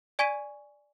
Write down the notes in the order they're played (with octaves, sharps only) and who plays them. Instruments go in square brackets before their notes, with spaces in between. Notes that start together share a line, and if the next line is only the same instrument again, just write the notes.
[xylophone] D5 G#5 C#6 G#6 B6 D#7